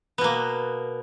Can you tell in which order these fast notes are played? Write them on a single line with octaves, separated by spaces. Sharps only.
B3 B2 A#3